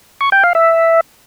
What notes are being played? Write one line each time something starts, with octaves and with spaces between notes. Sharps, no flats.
C#6
G5
F5
E5